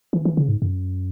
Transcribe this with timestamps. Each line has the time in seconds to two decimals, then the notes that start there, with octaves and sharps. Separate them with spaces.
0.13 E3
0.25 E3
0.37 C#3
0.49 G#2
0.62 F#2